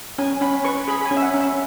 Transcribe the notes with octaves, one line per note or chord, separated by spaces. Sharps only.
C#4 G#5
C#4 B5
B4 C#6
G#4 B5
B5
G#5
C#4
E5
F#5
C#4
E5